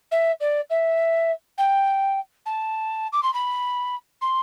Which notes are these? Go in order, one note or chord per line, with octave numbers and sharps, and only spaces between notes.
E5
D5
E5
G5
A5
D6
C6
B5
C6